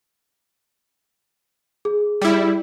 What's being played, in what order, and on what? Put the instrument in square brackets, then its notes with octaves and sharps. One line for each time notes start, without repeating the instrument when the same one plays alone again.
[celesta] G#4
[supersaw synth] G3 E4